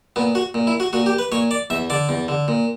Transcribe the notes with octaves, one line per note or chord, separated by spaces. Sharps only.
A#2 B3
F#4
A#2
E4
F#4
A#2 F#4
G4
B4
A#2 C#5
D5
E2 E5
D3 D5
E2
D3
A#2